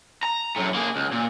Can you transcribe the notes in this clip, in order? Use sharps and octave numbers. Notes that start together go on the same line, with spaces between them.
A#5
F#2 A2
A#3 G#4
C#2
A#2